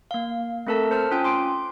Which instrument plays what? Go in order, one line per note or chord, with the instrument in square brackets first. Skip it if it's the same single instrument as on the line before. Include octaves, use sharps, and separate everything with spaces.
[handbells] A#3 F5
A3 C4 A4 A#4 A5
C5 A5 F6
C#4 F4 G5 G#5
C6 D6 D7